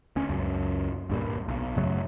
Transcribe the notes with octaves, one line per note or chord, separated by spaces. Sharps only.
D2 C#4
C#2 F#2
D2 G2 A#2
B1
F#2 C#3 F#3 A3